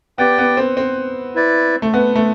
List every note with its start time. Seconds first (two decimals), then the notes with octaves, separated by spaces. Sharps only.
0.18 B3 G4 D5 G5
0.38 B3
0.57 C4
0.77 C4
1.35 E4 B4 D5
1.82 A3
1.94 B3
2.16 A3